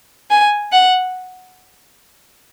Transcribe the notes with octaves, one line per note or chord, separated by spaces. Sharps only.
G#5
F#5